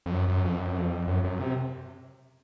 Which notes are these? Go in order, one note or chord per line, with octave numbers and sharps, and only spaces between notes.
F2
F#2
F#2
F2
F#2
F2
F#2
F#2
C3